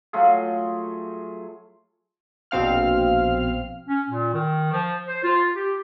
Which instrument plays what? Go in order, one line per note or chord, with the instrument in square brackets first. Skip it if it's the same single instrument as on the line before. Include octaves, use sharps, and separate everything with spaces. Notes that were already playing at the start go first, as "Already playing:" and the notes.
[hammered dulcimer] F#3 A3 F4 G#4
[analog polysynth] A#1 B2 C4 F5 F6
[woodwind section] C#4
A#2
D#3
F3
C5
F4
G4